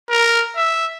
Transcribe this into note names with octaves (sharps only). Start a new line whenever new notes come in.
A#4
E5